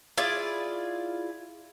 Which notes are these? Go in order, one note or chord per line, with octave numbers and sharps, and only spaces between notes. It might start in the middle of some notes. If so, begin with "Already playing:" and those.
E4 F4 G#4 D5